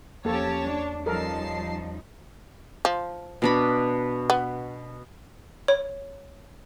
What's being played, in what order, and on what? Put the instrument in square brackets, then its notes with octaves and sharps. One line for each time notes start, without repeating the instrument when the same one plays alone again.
[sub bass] E2 [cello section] F3 C#4 G4 [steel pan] A#3 A4 [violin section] C#5 A5
[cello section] D4
[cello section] F3 G3 D#4 [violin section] C#4 A5 C7 [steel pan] A4 A#4
[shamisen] F3
[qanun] B2 D4 B5
[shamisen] B3
[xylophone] C#5